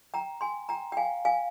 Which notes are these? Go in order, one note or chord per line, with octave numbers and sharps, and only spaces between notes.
G5 A#5
G#5 C6
G5 A#5
G5
F5 G#5
F5 G#5